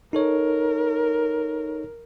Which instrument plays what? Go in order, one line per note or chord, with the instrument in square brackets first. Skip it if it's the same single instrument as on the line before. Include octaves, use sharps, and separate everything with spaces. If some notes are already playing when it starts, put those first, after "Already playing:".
[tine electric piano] D#4 A4 C#5 [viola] A#4